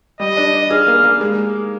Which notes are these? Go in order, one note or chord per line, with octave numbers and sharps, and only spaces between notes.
G3 D#5
D4
D4
G#4 F5
A#3
A#3
G#3